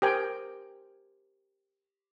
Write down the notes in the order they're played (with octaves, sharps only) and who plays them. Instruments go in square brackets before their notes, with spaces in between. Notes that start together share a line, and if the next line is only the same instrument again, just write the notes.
[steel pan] G4 A#4 C5 G5 G#5